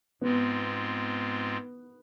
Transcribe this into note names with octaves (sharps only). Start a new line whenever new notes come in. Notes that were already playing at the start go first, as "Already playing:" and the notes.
G#2 G#3 B3 C4 F4